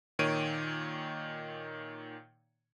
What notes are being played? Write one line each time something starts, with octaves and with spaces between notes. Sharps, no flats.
A#2 D#3 C#5 D7 D#7